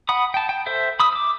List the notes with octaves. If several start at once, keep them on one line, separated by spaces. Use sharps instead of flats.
F#5 B5 D#6
G5 A5
G5
A4 C5 E5
B5 D#6 E6
D6 E6